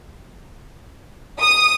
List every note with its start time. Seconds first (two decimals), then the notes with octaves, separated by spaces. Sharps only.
1.40 D#6